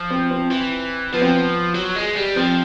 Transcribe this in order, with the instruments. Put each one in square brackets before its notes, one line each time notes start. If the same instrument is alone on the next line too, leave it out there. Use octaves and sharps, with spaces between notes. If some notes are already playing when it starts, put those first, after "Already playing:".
Already playing: [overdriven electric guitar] F3
[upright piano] C4
C4
[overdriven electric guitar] E3
[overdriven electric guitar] F3 [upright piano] B3
[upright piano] C4
B3
[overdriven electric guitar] F#3
G#3
G3
[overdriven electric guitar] F3 [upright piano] C4